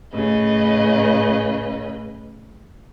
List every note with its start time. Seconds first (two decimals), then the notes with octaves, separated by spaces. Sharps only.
0.13 A2 C#3 B4 D#5